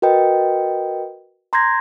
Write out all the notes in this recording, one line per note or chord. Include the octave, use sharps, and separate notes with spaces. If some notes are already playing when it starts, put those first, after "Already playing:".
F#4 A#4 B4 D#5 G5
A#5 C6 G6 G#6 A#6